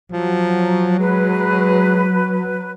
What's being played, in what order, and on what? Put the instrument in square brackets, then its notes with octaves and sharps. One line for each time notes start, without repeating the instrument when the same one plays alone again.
[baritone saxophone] F3 [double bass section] F#3
[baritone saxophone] G#3 [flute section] B4